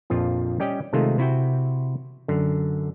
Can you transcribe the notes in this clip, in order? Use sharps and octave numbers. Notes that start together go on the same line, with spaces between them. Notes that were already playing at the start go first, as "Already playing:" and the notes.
A#1 F2 F3 F4
G3 C#4 G4 D5 D#5 G5
C3 D#3 G#3 A3 D#4 F4
C3 E4 F#4 G5
F#2 D3